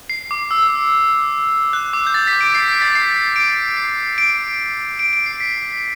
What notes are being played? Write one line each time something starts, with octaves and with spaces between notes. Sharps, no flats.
C7
D6
E6
F#6
D6
G6
A6
B6
D7
C7
B6
A6
C7
D7
C7
D7
D7
D7
C7
B6